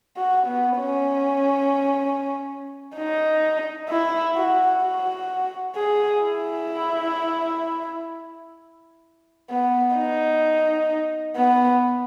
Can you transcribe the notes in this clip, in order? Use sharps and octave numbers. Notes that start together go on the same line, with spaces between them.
F#4
B3
C#4
D#4
E4
F#4
F#4
G#4
E4
B3
D#4
B3